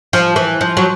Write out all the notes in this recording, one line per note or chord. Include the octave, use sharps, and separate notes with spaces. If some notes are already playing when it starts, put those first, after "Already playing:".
F3
E3
F3
F#3